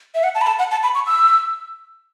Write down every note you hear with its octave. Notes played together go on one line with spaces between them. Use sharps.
E5
F#5
A5
B5
A5
F#5
A5
B5
C#6
E6